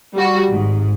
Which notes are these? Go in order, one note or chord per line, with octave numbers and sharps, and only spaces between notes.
G3 F#4
G#1 G#2